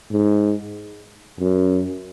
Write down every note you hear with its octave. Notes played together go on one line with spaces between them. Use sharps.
G#2
F#2